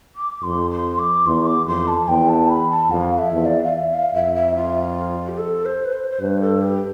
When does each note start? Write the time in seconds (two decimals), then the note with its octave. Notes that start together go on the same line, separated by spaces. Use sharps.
0.16 D6
0.43 F2 C6
0.70 C6
0.99 D6
1.26 E2 C6
1.46 D6
1.67 F2 C6
1.87 A5
2.08 E2 G5
2.29 A5
2.50 B5
2.70 A5
2.91 F2 F5
3.18 E5
3.31 E2
3.45 D5
3.64 F5
3.73 E5
3.94 F5
4.14 F2 E5
4.35 E5
4.55 F4
5.28 G4
5.38 A4
5.65 C5
5.85 B4
5.92 C5
6.11 C5
6.20 G2 B4
6.40 A4
6.61 G4